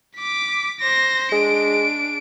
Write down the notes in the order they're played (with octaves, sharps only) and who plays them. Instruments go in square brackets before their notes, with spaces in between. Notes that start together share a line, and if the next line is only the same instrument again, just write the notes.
[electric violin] D6 B6
C5 A#6
[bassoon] G#3 [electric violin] D4 D7